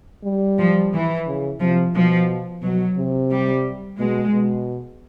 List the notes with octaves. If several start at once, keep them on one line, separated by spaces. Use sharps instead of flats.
G3
F3
E3
C#3
C3 F3
B2 F3
B2 F#3
C3
G3
B2 G#3
B2